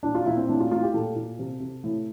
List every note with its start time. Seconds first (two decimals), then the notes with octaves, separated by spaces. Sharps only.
0.03 A#2 D4
0.15 F4
0.26 A#2 E4
0.37 C4
0.49 A2 D4
0.60 F4
0.71 A2 F4
0.83 G4
0.94 A#2 A4
1.16 A#2
1.39 C3
1.60 C3
1.84 A2